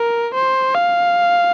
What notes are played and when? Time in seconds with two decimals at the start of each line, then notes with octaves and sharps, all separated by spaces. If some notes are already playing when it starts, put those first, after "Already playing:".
Already playing: A#4
0.34 C5
0.75 F5